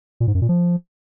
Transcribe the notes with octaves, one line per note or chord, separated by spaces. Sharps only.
A#2
G#2
F#2
A#2
F3